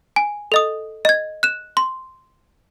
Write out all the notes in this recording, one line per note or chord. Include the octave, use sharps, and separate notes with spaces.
G#5
A4 D#5 D#6
D#5 G#6
F#6 E7
C6